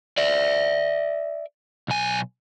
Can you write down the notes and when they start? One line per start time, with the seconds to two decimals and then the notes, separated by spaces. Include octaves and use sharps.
0.18 D5 E5
1.88 B1 G#5